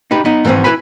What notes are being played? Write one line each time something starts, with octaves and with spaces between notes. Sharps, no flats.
D#4 G4 B4
B3 D#4
G#2 E3 F3 G3 C4 C#4
E4 B4 G#5 B5